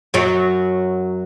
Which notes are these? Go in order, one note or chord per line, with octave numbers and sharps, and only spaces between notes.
F#2 F#3